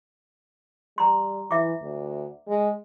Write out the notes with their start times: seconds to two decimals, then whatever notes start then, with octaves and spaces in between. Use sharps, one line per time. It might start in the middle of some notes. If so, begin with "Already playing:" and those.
0.98 G3 A#5 C6
1.51 E3 E5 D6
1.82 D2
2.48 G#3